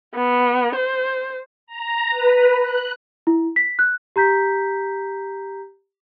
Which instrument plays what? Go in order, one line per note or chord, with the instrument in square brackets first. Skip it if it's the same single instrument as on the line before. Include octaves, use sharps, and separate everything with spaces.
[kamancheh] B3
C5
[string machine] A#5
B4
F#6
[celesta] E4
B6
F#6
G4 A#5 G6 B6